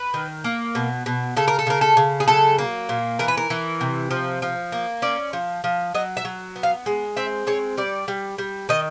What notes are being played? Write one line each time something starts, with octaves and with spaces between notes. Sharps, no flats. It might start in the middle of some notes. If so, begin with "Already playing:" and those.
Already playing: B4
D#3
A#3
B2
B2
C#3 A4
A#4
A4
C#3 A#4
A4
C#3
G#4
F#3 A4
A#3
A#2
E3 A#4
B4
A#4
E3
C3
F3
F3
A#3
C#4 D5
F3
F3
F#3 D#5
E5
F#3
B3
F5
G#3
C4 E5
G#3 C#5
G3 D5
G3
G3
D#3 D#5